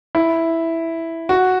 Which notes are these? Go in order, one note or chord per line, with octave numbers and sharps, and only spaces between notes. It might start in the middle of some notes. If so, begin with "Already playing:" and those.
E4
F#4